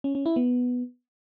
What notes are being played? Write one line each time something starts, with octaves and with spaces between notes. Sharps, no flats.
C#4
C#4
E4
B3